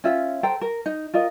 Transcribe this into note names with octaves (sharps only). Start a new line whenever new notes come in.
C#4 F4 E5 F#5
A4 C5 G5 A#5
A#4
D#4
F4 A#4 D#5